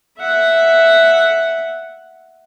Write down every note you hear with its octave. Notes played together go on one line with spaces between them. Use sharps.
E5 F#5